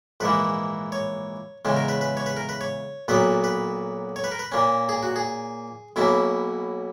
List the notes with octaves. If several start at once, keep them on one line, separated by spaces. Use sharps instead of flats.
A#1 G#2 E3 A#3 B4
C#5
E2 C#3 G#3 C#4
A#4
B4
B4
C#5
B4
A#4
B4
C#5
B1 A#2 F#3 B3 B4
B4
C#5
B4
A#4
B4
A#2 A#3 C#4
G#4
F#4
G#4
B1 B2 A#3 C#4 E4